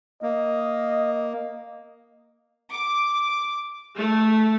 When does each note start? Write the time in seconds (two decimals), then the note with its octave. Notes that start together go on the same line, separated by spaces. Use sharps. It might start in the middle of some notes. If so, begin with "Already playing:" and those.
0.23 A#3 D#5
2.70 D6
3.96 A3